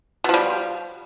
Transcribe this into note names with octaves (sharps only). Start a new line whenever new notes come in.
B2 F3 G3